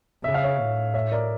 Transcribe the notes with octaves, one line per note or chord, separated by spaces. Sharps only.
C#3 E5
F5
C#5 E5
A2
C#5 E5
A#4 D5